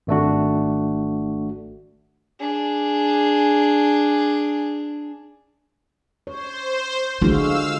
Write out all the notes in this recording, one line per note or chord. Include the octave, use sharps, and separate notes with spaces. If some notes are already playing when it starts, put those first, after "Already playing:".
G#1 A3 D4 F#4
D4 G#4
C5 C#5
D3 G#3 F4 F#4 F5 E6